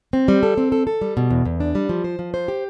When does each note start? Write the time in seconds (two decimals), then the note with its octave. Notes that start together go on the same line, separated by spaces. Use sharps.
0.13 C4
0.28 G3
0.43 A4
0.58 C4
0.72 A4
0.87 A4
1.01 G3
1.17 B2
1.31 E2
1.45 E2
1.60 D4
1.75 G3
1.89 F3
2.04 C5
2.19 F3
2.34 C5
2.48 G4